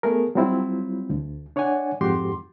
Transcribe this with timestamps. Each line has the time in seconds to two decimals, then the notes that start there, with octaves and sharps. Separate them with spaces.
0.03 A3 B3 G#4 A#4
0.35 F#3 G3 C4 E4 F4
1.10 D2
1.56 D4 C#5 D5 F#5 G#5
2.01 F2 G#2 F#4 G4 C6 D6